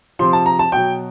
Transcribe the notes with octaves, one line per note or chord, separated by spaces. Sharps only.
C3 F3 C6
A5
A#5
A5
B2 F#3 G5